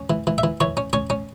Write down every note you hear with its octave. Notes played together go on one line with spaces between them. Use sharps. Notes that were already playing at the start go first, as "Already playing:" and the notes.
Already playing: C#4
E3
E3
E5
E3
E3 C#5
C#4
C#4 C#5
C#4